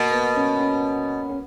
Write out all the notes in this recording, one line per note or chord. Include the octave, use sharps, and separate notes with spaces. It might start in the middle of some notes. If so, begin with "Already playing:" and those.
Already playing: B2 A#3
B3
C#4
C#4
C#4